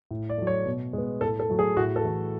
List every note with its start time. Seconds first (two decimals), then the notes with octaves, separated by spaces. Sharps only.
0.11 A2
0.30 D5
0.38 F#3 A3
0.47 C#5
0.66 B2
0.93 G#3 B3
1.21 A2 A4
1.40 A4
1.50 F#3 A3
1.59 G#4
1.77 A2 F#4
1.96 A4
2.04 E3 A3